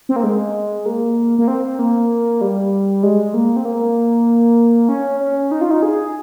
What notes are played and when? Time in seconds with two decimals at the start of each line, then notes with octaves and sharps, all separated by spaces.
0.09 C4
0.16 A#3
0.24 G#3
0.86 A#3
1.39 A#3
1.48 C4
1.79 A#3
2.41 G3
3.03 G#3
3.34 A#3
3.57 C4
3.65 A#3
4.89 C#4
5.20 C#4
5.51 D#4
5.61 F4
5.71 D#4
5.82 G#4